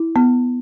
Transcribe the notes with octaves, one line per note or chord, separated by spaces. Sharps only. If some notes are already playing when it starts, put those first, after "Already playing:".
Already playing: E4
B3